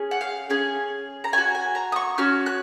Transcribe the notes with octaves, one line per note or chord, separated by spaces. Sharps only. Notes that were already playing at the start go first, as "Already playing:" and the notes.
Already playing: C#4 G#4
F#5
F5
C#4 G#4
A#5
C#4 F#4 G#5
G#5
A#5
D#6
C#6
C#4 F#4 F6
F#6